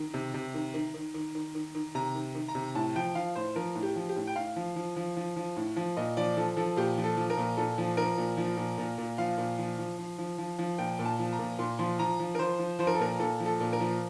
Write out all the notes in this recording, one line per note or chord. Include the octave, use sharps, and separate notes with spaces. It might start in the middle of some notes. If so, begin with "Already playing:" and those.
Already playing: D#3
C3
C3
D#3
D#3
D#3
D#3
D#3
D#3
D#3
C3 A#5
D#3
D#3
A#5
C3
A2 A5
F3 G5
F3 F5
A2 C5
F3 A#4
A2
G4
F3
G4
A2
G5
A2 F5
F3
F3
F3
F3
F3
A2
F3
A#2 D#5
F3 D5
F3 A4
F3 A4
A#2 G4
F3
A4
F3
A#4
A#2
A#2 A4
F3
F3 A#4
A#2
F3
A#2
A#2
A#2
F3 F5
A#2
F3
F3
F3
F3
F3
F3
A#2 G5
A#2
A5
F3
A#5
A#2
A#2 C6
F3 C6
F3 A#5
F3
A#4
F3 C5
F3
F3 C5
A#4
A4
A#2 A#4
A#2 A4
F3
A4
A#2
A#4
F3